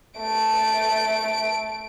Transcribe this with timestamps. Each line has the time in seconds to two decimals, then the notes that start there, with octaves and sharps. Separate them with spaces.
0.19 A3 D7